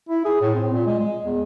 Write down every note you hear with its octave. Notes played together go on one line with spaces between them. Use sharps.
E4
G#4
A2
C4
A#2
G#3
G#3
E2